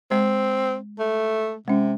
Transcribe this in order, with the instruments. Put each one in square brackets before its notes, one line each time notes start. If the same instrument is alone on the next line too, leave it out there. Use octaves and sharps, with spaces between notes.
[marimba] G#3 [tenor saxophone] C4
[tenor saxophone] A3
[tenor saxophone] C3 [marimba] G#3 C#4